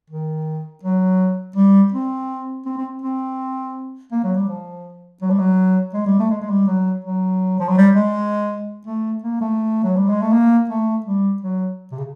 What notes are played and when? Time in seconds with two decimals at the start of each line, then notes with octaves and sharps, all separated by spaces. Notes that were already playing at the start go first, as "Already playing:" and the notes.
0.10 D#3
0.83 F#3
1.56 G3
1.92 C4
2.66 C4
2.78 C4
3.02 C4
4.12 A#3
4.24 F#3
4.36 G3
4.48 F3
5.22 F#3
5.30 G3
5.39 F#3
5.94 G#3
6.07 G3
6.19 A3
6.31 G#3
6.41 G#3
6.50 G3
6.67 F#3
7.04 F#3
7.60 F3
7.68 F#3
7.77 G3
7.95 G#3
8.86 A3
9.23 A#3
9.41 A3
9.84 F#3
9.97 G3
10.09 G#3
10.21 A3
10.32 A#3
10.70 A3
11.06 G3
11.42 F#3
11.92 C3
11.98 C#3